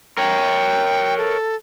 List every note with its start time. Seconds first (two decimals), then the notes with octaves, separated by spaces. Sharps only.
0.18 A#4 C#5 G5
1.18 A4